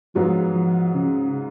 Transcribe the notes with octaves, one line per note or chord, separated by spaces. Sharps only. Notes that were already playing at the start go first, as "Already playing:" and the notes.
G#2 F3 F#3 B3 F4
F3
C#3